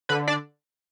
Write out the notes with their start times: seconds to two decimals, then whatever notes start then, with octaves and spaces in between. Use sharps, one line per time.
0.09 D3 B4 B5
0.28 D4 D5